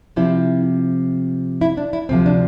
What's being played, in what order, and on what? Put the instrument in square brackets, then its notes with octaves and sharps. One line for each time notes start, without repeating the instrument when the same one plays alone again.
[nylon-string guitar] C3 F3 C4 E4
E4
D4
E4
D2 C3 F3 C4
D4